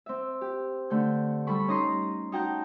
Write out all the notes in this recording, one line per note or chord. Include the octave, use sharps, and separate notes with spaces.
C4 E5
G4
D3 A3 G6
G3 A4 B5 C#6
C#4 D#4 D#5 A#5 C6
D#4 F#4 G5 A5 A#5 G6